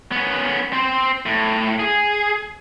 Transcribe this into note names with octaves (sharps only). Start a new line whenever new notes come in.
B3 C#4
C4 C5
A2
G#4